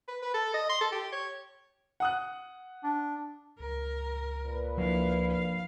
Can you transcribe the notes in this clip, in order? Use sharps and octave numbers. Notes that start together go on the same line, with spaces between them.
B4
B4
A4
D#5
C6
A4
G4
C#5
F#5 D#6 F#6
D4
C#2 A#4
A#2 B4
F3 A#3 D4 E4 F5
F5